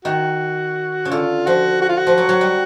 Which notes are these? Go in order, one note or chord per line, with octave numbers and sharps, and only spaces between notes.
D#3 F#4
C#3
D3 F4
F3 F#4
F#4
F4
F#4
F3
F#3
F#3
G3